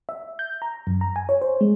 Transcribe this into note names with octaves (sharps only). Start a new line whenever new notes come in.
E5
G6
A#5
F#2
A#5
G#5
C#5
C5
G#3